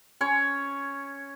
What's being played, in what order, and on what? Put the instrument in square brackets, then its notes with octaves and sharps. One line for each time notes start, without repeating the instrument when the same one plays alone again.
[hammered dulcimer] C#4 C#5